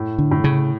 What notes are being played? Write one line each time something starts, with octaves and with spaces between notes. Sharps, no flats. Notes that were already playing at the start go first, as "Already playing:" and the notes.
Already playing: A2
D3
A2
C#3